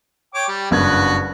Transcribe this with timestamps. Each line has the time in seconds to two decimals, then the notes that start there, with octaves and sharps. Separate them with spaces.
0.34 C#5 G5 D6
0.48 G3
0.71 F#1 G2 B3 F#4 G#6